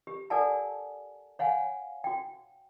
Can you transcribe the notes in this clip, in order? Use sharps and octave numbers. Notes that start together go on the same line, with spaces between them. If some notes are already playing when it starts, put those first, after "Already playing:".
G4
A4 A#4 D5 F#5 G#5 A5
C#5 F5 F#5 G#5
F#4 G5